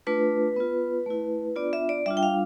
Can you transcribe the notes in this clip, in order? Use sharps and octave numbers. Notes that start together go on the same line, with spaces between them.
A3 D4 F4 B4
B3 F4
A3 E4
B3 D4 F4 D5
E5
D5
G3 D4 F4 E5
G5
F5